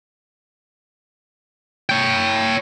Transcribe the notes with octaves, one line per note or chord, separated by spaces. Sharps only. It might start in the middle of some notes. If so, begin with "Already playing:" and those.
C#5 G5